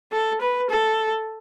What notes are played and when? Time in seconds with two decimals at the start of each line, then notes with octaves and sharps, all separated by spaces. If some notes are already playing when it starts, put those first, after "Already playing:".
0.12 A4
0.41 B4
0.70 A4